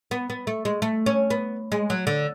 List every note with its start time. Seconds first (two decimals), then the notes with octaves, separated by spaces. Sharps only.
0.11 B3
0.30 B3
0.47 A3
0.65 G#3
0.82 A3
1.06 C#4
1.30 B3
1.72 G#3
1.90 F#3
2.07 D3